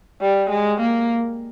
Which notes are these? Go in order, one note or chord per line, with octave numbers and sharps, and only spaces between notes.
G3
G#3
A#3